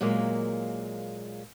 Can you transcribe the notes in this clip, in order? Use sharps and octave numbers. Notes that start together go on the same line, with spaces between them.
A#2 F#3 G#3 A#3